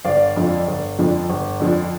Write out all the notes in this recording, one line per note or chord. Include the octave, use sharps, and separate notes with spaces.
G1 D5 F5
F2 D3 F3
G1
F2 D3 F3
G1
F2 D3 F3